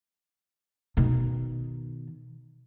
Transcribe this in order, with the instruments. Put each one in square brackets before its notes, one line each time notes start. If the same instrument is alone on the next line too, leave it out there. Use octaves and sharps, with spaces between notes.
[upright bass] B2 D#3